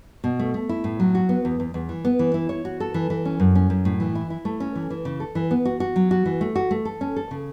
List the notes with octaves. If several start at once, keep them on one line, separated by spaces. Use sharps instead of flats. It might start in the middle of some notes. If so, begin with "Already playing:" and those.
B2
A3
A3
E4
A2
F#3
F#4
B3
E2
E2
E2
E3
B3
E3
E4
C#5
F#4
A4
E3
E3
C#4
F#2
C#4
F#2
A2
E3
E4
E4
A3
C#4
E3
E3
C#3
A4
E3
B3
F#4
F#4
F#3
F#4
E3
A3
F#4
A3
A4
C#4
A4
C#3